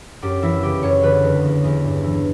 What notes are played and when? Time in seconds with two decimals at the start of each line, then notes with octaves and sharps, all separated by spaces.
0.22 F#2 G4
0.42 E3 E4
0.62 C#3 G4
0.82 F#2 C#5
1.02 D3 B4
1.23 E2
1.43 E2
1.64 E2
1.84 G2
2.03 E3